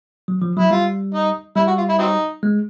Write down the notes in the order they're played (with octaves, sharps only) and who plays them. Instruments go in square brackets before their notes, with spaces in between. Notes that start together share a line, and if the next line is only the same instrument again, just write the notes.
[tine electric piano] F#3
F3
[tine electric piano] F#3 [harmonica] E4
[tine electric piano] G3 [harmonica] F4
[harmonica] D#4
[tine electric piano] G3 [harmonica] E4
[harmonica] F#4
F4
E4
F#3 C4 D#4
[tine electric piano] G#3